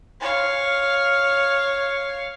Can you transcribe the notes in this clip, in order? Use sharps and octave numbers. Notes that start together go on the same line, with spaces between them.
C#5 F5